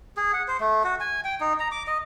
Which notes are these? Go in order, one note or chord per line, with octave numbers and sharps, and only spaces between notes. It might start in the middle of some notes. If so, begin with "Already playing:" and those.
G#4
F#5
C5
A3
F#4
G#5
G5
D#4
A#5
D6
D#5